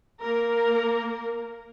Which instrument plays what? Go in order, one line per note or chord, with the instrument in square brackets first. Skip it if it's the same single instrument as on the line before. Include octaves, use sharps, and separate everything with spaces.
[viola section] A#3 A#4